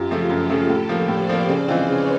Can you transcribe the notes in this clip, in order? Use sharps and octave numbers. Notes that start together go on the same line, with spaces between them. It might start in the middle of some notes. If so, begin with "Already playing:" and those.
Already playing: F#2 F4 G4
C#3 F3 A3
F#2 G4 A4
C#3 F3 A3
A2
F3 A#3
A2 C5 D5
F3 A#3
C#3
E3 G#3 C4 F4
C#3 B4 C#5